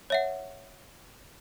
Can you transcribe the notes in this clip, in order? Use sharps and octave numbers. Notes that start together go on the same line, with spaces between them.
C#5 E5 F#5